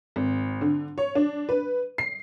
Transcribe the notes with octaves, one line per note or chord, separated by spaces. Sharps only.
G#1
D3
C#5
D4
B4
C7